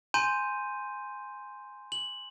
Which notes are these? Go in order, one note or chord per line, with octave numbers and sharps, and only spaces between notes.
G#5 A#5 C6 G6 D#7
F#7